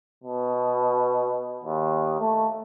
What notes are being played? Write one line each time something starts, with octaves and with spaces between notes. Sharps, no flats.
B2
D#2
A3